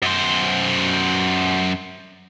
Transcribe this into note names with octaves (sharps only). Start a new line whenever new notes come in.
F#2 C5